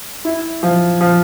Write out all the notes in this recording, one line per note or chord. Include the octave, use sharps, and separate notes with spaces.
E4
F3
F3